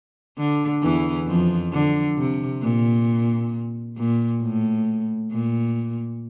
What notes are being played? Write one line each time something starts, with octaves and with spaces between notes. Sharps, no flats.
D3
E2 E3
F2 F3
D3
C3
A#2
A#2
A2
A#2